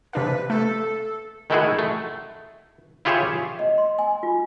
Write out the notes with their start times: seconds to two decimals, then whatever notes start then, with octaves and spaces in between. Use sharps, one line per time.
0.13 C3 D4 B4 F5
0.50 A3 A4
1.50 D#3 G#3 A3 E4 F#4 G#4
1.79 A3
3.05 E4 F4 G4 G#4 C#5 E5
3.59 D#5
3.78 C6
3.99 G#5
4.23 F4